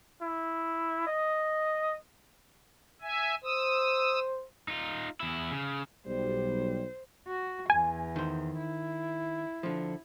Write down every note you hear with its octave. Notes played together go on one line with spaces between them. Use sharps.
E4
D#5
E5 G#5
C5 D#6 E6
D#4 F4
E2 E4
C#3
B1 G3 C5
F#4
E2 G#5
D#3 C5
E4
D3 F3